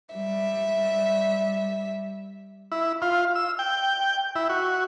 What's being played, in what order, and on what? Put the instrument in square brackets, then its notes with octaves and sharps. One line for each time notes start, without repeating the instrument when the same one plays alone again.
[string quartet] G3 E5
[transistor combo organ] E4
F4
E6
G5
E4
F#4